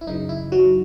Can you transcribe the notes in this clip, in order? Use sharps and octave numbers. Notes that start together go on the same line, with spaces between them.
E4
F#2 C#3 E3 D#4
E4
F#3 F#4